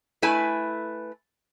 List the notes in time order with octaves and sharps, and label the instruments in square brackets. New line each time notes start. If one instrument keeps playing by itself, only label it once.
[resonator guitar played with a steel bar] A3 E4 B4 G#5